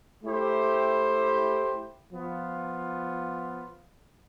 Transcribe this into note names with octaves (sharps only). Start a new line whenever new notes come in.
A3 E4 G4 C5
F3 B3 F4